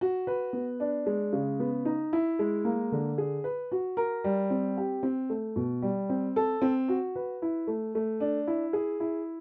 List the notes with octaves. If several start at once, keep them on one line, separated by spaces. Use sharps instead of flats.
F#4
B4
B3
D4
G#3
C#3
B3
D#4
E4
G#3
A#3
D3
G#4
B4
F#4
A#4
G3
C4
G4
C4
A3
B2
G3
C4
A4
C4
F#4
B4
E4
A3
A3
D4
E4
G#4
E4